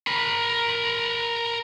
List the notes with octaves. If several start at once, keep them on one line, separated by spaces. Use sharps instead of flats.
A#4 B5